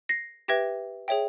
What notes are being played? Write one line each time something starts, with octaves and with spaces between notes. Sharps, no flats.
A#6 C7
G4 B4 E5 G5 G#6 A#6
G#4 C#5 E5 G5